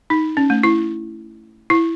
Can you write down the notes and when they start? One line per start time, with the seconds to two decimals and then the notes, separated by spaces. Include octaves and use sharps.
0.10 D#4
0.37 C#4
0.50 A3
0.63 E4
1.70 E4